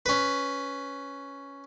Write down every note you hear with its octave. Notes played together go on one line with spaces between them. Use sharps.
C#4 B4